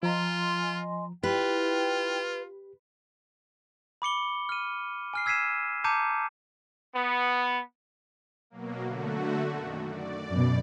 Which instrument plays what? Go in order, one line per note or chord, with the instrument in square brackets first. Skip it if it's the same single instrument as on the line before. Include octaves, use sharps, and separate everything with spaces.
[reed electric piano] F3 A#5 [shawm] F4 [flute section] D#5 G#5 C6
[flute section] E4 G5 [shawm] F4 [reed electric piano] G4 [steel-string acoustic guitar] B4
[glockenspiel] B5 D6 C#7 G7
F6 D#7
G#5 F6 C7
E6 G#6 B6 C7 D#7 E7
A5 A#5 D6 G6 C#7 D#7
[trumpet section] B3
[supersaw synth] B2 F#3 A#3
D3 A3 F#4
F#2 D#3
D5
[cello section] F#2 B2